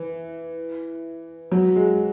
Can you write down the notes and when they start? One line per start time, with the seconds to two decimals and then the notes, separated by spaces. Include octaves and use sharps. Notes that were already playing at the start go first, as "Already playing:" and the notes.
Already playing: E3
1.52 F#3
1.76 G#3